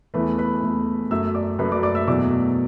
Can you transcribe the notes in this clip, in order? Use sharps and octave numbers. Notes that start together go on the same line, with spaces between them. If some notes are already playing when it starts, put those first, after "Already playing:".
E2 E3 A3 B4 B5
B4 B5
E2 E3 A3
F#2 F#3 A3 E5 E6
D5 D6
F#2 F#3 A3 B4 B5
D5 D6
D5 D6
E5 E6
E2 B2 F#3 A3 D5 D6